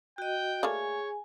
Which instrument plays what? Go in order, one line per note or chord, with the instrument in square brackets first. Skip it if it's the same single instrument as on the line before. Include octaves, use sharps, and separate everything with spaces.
[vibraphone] F#4 D#5 [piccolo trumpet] G5
[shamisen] A3 A#3 D5 [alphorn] G#4 [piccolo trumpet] C#5 [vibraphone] G#5